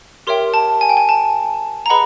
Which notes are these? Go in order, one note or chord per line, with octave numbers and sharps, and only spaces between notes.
G4 A#4 C#5 E5 G5 C6
A5
G#5
G5
G#5
A5
A#5
G#4 B4 D#5 F#5 B5